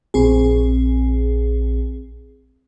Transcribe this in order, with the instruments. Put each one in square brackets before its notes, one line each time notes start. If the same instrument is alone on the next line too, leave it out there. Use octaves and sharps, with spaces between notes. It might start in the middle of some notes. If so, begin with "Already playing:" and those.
[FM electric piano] A#1 C4 G#4